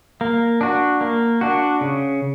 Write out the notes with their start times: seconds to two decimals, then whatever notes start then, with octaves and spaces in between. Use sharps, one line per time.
0.21 A#3
0.61 D4 F#4
1.01 A#3
1.41 D4 F#4
1.81 C#3